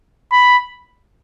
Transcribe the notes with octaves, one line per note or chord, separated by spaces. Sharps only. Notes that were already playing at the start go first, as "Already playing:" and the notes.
B5